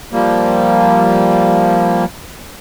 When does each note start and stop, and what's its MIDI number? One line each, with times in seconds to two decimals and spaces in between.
0.13 2.05 53
0.13 2.05 55
0.13 2.05 58